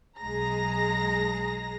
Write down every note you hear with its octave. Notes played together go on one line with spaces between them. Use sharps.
B1 G#3 G#4 A#5 A#6